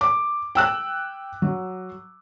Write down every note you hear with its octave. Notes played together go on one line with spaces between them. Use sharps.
D6
G5 E6 F#6
F#3